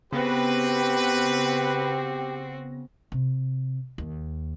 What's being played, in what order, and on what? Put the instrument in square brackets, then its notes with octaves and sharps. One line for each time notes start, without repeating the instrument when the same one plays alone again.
[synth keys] C#3 B3 A#6 [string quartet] C4 F#4 [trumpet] G4 [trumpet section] B4
[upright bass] C3
D#2